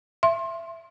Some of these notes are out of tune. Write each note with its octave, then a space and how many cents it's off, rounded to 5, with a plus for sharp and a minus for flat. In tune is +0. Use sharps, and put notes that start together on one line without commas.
E5 +25 C6 +25